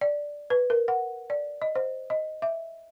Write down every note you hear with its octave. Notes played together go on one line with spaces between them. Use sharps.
D5
B4
A#4
F#5
D5
D#5
C5
D#5
E5